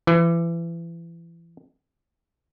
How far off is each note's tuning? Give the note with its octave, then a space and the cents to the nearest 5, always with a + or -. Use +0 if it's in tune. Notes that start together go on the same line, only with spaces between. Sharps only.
E3 +30